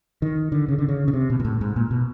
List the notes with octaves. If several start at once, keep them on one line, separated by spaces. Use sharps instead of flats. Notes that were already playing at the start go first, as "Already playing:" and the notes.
D#3
D3
C#3
D3
C#3
C#3
C3
B2
A#2
A2
G#2
A#2
B2